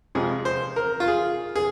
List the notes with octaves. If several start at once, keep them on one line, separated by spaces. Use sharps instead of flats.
F2 C3 F3 G#3 G#4
C5
A#4
F4
G#4
G#4